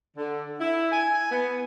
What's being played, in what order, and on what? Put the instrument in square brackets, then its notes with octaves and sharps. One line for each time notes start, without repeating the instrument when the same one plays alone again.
[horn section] D3
E4
G#5
B3